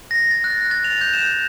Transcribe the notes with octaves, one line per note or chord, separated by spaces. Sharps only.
A#6
A6
F#6
A6
F7
G6
E7